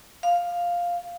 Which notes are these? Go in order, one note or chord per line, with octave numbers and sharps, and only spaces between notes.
F5